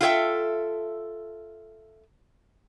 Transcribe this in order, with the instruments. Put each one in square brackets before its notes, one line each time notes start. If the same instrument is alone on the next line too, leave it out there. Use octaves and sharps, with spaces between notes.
[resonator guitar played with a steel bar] F4 F#4 A4 C#5 E5 G5